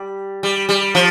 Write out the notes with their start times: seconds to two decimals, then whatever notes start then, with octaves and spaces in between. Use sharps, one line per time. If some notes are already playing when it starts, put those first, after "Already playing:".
Already playing: G3
0.43 G3
0.69 G3
0.95 F3